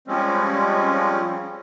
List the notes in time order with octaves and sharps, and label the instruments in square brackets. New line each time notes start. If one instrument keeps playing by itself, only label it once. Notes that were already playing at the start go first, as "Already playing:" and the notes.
[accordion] F3 G3 G#3 C4 C#4